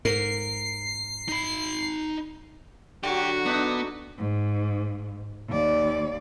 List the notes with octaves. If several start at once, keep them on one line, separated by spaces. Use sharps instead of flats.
G#2 A#4 C7
D#4 B5
D3 F#3 F#4 G4
B3 D4 D#4
G#2
D#2 D5